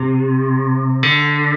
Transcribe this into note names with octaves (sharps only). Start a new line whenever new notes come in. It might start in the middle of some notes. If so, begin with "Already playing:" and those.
Already playing: C3
D3